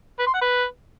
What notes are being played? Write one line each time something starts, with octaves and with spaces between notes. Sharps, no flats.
B4
C6
F#5
B4